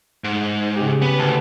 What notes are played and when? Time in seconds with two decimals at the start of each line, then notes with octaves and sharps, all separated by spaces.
0.24 G#2
0.76 C#3 G4
1.02 B3 B4
1.19 D2 E4 B4 A5